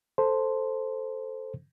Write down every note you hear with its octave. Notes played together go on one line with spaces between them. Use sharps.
A4 C5